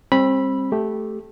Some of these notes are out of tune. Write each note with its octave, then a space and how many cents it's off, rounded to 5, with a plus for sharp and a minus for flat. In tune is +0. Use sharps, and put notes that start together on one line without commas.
G3 +30 C4 +25 B5 -10
A3 -10 G4 +0